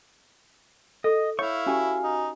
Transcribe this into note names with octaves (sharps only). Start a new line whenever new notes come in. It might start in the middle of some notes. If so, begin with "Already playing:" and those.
A4 D#5
E4 C#5 F5 C#6
C#4 F#4 G4 G#5
D#4